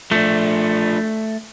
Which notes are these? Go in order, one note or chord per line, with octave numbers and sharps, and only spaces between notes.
F3 A3 D4